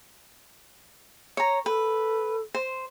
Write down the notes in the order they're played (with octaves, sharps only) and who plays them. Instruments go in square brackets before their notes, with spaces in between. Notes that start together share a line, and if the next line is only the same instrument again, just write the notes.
[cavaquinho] C#5 A#5
[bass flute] A4 [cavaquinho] B4
[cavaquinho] C5